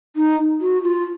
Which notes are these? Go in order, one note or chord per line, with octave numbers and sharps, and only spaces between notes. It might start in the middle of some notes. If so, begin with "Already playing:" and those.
D#4
F#4
F4